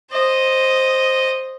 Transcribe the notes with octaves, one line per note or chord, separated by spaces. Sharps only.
C5 D#5